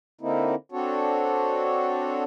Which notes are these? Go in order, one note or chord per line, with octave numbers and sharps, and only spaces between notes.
D3 A#3 C4 D#4 E4
C4 D4 F#4 A4 C#5